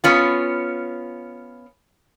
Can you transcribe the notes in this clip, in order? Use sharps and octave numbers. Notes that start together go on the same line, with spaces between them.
B3 C#4 F4